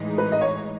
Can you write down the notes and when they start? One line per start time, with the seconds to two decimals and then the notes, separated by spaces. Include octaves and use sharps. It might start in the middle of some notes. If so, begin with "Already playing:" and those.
Already playing: A2 E3 G#3 D#4
0.18 B4
0.32 D#5
0.41 C#5